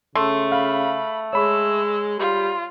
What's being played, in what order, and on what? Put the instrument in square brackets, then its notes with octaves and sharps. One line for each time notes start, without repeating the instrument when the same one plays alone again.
[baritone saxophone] C#3 [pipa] A3 [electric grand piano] C6
[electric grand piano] F5 [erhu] B5
[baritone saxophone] G#3 [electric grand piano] C#5 B5 C#6 [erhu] E6
[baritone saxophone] G3 [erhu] F4